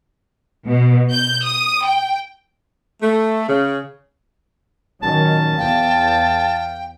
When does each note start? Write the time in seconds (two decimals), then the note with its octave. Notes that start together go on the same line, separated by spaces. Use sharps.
0.67 B2
1.12 G6
1.45 D#6
1.85 G5
3.02 A3
3.49 C#3
5.03 A#2 D#3 F#3 C#4 A5
5.59 E2 F5 G5